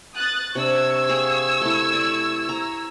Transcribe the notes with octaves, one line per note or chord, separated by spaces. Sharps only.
D#6 F#6 A6
C3 D4 C#6 E6 G#6
G#4 F5 G5
A3 E4
D5
A#5